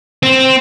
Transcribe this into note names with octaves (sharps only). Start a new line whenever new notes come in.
C4